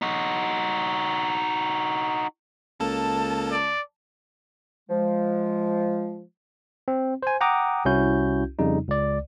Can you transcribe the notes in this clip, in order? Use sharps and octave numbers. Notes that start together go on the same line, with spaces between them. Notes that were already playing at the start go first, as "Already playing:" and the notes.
D#4 F#4
C#2 A#3 A4 A5
D5
F3 G#3
C4
C5 G#5
F#5 G5 A#5 D6 D#6
C2 C#4 E4 F#4 G6
F2 C#3 G3 D#4
C#2 D5